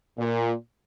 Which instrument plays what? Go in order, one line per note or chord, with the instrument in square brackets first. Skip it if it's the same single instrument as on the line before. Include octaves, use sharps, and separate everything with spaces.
[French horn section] A#2